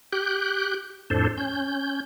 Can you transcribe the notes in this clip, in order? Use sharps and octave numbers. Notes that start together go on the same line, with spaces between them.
G4 F#6 G6
F2 A2 D4 A4 C5
C#4 G6